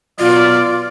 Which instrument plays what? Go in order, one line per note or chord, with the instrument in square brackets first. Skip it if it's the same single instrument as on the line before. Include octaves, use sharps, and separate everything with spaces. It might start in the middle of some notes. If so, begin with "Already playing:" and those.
[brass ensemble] B2 F#3 D5 [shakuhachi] F4